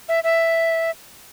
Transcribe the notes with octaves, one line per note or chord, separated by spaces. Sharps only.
E5
E5